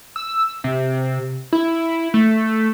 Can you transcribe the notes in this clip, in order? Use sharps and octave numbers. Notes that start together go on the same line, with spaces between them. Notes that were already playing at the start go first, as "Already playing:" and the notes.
E6
C3
E4
A3